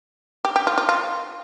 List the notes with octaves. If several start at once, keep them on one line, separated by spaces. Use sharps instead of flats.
G4
G4
F4
F4
F4